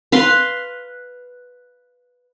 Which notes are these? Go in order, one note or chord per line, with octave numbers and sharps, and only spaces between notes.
B4 F5 C6